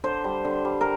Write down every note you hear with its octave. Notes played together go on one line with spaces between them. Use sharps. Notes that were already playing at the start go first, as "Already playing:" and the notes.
D3 C5
G3
D3
G3
A#4